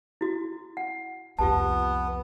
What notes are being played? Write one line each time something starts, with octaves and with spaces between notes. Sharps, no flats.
E4 F#4
F#5
C2 F2 B3 F4 G4 A5